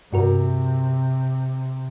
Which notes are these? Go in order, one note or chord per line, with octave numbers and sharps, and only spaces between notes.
G2 C3 F#4 A#4